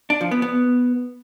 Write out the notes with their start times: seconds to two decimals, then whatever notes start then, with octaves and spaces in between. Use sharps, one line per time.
0.10 D4
0.21 F3
0.31 B3
0.42 B3